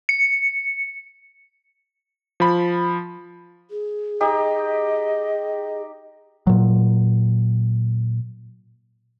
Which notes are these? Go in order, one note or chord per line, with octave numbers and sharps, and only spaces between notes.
C#7
F3 B5
G#4
D#4 G4 D#5
A#2 F#3